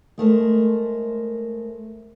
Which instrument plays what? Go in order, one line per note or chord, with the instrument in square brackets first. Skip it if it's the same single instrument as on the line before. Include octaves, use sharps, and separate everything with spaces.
[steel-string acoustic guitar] G#3 A3 A#4 C5